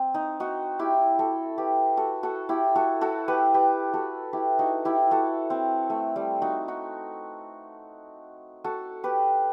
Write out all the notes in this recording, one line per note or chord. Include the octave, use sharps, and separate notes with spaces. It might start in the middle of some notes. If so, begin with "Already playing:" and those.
Already playing: C4
D#4
D#4 F#4
E4 G4
F#4 A4
G4 B4
F#4 A4
F#4 A4
E4 G4
F#4 A4
F#4 A4
G4 B4
G4 B4
F#4 A4
E4 G4
D#4 F#4
E4 G4
F#4 A4
C4
A3
G3
D#4 F#4
D#4 F#4
F#4 A4
G4 B4